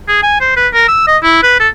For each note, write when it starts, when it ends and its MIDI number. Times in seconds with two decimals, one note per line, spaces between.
0.08 0.23 68
0.23 0.37 80
0.41 0.52 72
0.57 0.68 71
0.74 0.84 70
0.88 1.07 88
1.07 1.17 75
1.23 1.40 64
1.43 1.56 71
1.60 1.68 69